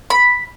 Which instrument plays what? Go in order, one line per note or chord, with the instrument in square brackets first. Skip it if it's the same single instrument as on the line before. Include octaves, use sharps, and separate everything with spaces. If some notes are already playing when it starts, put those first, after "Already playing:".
[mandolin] B5